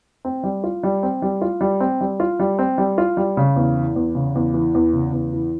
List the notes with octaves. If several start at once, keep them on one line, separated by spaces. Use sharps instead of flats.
C4
G3
F4
G3
C4
G3
F4
G3
C4
G3
F4
G3
C4
G3
F4
G3
C#3
E2
E3
E2
C#3
E2
E3
E2
C#3
E2
E3